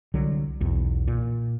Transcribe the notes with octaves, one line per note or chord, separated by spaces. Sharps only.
C2 D3 F#3
B1 E2
A#2